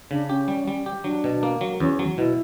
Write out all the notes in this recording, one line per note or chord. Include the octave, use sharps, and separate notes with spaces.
C#3 D4
C#4 G4
G3
G3
G4
F#3 D4
B2
A#3
F#3
E2 C#4
F#3
B2 E4